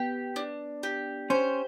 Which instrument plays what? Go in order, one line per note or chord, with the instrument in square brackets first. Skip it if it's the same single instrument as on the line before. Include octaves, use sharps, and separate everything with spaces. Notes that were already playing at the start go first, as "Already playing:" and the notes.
Already playing: [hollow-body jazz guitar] B3 [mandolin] G4
[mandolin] D4
G4
[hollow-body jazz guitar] C#4 [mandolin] C5